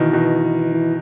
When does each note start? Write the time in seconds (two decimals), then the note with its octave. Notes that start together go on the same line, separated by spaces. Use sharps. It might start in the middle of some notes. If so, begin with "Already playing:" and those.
Already playing: B2 D#3 E3
0.13 B2 D#3
0.73 E3